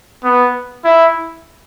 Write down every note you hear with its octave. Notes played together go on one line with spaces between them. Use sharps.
B3
E4